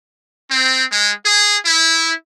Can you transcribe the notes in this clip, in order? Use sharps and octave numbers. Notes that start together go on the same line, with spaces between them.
C4
G#3
G#4
E4